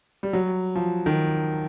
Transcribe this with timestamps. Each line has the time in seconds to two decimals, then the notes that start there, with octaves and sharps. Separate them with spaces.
0.23 G3
0.33 F#3
0.75 F3
1.06 D#3